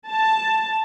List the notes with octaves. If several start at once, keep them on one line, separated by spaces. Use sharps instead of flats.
A5